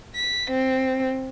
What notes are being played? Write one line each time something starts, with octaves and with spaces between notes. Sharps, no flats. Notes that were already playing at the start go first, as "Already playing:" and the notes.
B6
C4